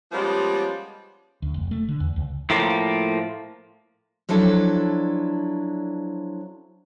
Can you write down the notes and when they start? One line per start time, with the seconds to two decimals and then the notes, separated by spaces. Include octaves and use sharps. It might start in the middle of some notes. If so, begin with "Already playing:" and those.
0.12 F3 G3 G#3 A#3 B3 C#4
1.42 D2
1.54 F1
1.71 A3
1.88 D3
2.00 E2
2.16 C#2
2.50 A2 F3 A#3
4.29 F3 F#3 D4 E4 A4